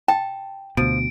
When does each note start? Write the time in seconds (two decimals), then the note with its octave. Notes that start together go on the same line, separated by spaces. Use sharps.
0.08 G5 A5
0.77 D2 B2 F3 D7